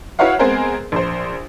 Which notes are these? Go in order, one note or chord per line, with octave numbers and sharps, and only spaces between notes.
E4 F#4 B4 C#5 F5 F#5
G#3 B3 C4 G#4 A#4 C5
A#1 C5